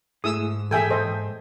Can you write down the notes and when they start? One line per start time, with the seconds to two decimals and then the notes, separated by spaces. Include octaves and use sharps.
0.24 G#2 A3 E4 G#4 D#6 E6
0.71 A#2 E3 G#4 A4 E5 G5 G#5
0.90 A4 C5 D#5